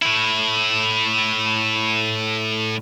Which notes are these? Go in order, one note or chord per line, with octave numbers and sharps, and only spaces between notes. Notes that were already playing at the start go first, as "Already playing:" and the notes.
A2 E4